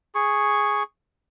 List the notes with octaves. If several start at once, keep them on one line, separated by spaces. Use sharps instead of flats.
G#4 C#6